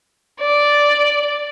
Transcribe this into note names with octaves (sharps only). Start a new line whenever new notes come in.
D5